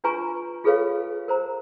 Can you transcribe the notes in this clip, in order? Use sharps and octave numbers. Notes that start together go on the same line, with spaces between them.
D4 F4 B4 G#5 A#5 C#6
F4 G#4 A4 B4 C#5 F5
A#4 C5 A#5